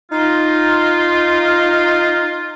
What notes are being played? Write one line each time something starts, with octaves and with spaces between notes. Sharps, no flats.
D#4 F4